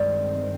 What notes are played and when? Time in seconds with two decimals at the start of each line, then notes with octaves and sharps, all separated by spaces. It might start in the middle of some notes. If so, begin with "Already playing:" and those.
Already playing: G2 D#3 G#3 C4 D5